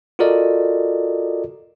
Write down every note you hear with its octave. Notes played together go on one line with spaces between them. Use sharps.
F4 F#4 A4 A#4 D5 D#5